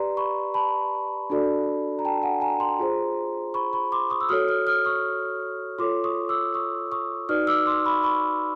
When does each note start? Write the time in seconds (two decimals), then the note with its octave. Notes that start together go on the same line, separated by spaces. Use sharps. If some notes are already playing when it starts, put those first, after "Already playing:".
Already playing: G4 B4 D5 A#5 C6
0.17 B5 C#6
0.54 A5 B5
1.30 D4 F#4 A4 D5
1.99 A#5
2.05 G5 A5
2.23 F#5 G#5
2.41 G#5 A#5
2.60 A#5 C6
2.79 F4 G#4 C5
3.54 B5 C#6
3.73 B5 C#6
3.92 C6 D6
4.10 C#6 D#6
4.21 E6
4.29 F#4 A4 C#5 D#6 F6
4.48 D#6 F6
4.67 D#6 F6
4.85 C#6 D#6
5.79 F4 A4 C#5 C6 D6
6.04 C#6 D#6
6.29 D6 E6
6.54 C#6 D#6
6.92 C#6 D#6
7.29 D#4 F#4 B4 D5 D#6 F6
7.47 D6 E6
7.66 C6 D6
7.85 B5 C#6
8.03 B5 C#6